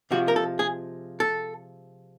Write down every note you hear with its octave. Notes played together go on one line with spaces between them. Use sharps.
C3 F3 G#3 F#4
A#4
A4
G#4
A4